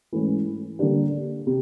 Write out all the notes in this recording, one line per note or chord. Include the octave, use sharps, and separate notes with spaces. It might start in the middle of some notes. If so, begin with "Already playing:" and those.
G#2 E3 A3 C#4
D3 G3 A#3 D4 G4
C3